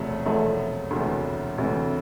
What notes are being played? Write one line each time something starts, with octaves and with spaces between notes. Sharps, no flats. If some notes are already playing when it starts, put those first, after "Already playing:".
Already playing: E1 E2 C3 F3 A3
E1 E2 C3 F3 A3
E1 D2 C3 E3
E1 D2 C3 E3